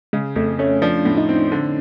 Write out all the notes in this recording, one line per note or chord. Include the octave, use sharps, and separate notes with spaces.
C#3 G#3
F2 A3
A3 C#4
F3 D4
A2
D#4
C4
D3